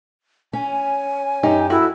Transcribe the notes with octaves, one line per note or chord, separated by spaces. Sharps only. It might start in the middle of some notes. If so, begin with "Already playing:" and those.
C#4 G#5
F#2 D#4 G4
E4 F#4 A4